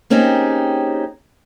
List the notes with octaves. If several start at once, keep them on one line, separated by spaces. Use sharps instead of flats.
A#3 C4 C#4 D#4 G4 G#4